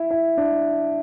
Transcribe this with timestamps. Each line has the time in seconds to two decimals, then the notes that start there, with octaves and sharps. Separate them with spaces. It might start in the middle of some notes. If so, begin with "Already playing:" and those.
Already playing: E4
0.11 E4
0.38 D4